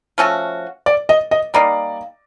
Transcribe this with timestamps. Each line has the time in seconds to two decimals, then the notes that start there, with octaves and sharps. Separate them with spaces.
0.18 F3 A3 C#4 F#4
0.86 D5
1.09 D#5
1.31 D#5
1.54 G3 A#3 D#4 D5